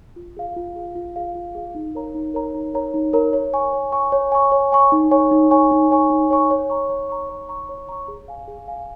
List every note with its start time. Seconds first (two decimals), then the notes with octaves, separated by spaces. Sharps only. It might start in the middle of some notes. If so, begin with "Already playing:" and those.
0.16 F4
0.37 G#4 F5
0.56 F4
0.76 G#4 F5
0.95 F4
1.16 G#4 F5
1.35 F4
1.55 G#4 F5
1.75 D#4
1.95 A#4 C#5 A#5
2.15 D#4
2.34 A#4 C#5 A#5
2.55 D#4
2.74 A#4 C#5 A#5
2.94 D#4
3.13 A#4 C#5 A#5
3.33 C#5
3.54 G#5 C#6
3.73 C#5
3.92 G#5 C#6
4.12 C#5
4.32 G#5 C#6
4.52 C#5
4.72 G#5 C#6
4.92 D#4
5.11 C#5 G#5 C#6
5.31 D#4
5.51 C#5 G#5 C#6
5.71 D#4
5.91 C#5 G#5 C#6
6.10 D#4
6.30 C#5 G#5 C#6
6.51 C#5
6.70 A#5 C#6
6.90 C#5
7.09 A#5 C#6
7.29 C#5
7.49 A#5 C#6
7.69 C#5
7.89 A#5 C#6
8.08 G#4
8.28 F5 G#5
8.48 G#4
8.68 F5 G#5